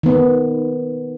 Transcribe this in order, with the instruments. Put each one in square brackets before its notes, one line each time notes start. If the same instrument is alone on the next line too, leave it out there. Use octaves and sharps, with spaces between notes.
[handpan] D#3 B3